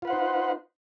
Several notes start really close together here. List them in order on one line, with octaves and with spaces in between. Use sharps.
F4 B4 F#5 C5 D#4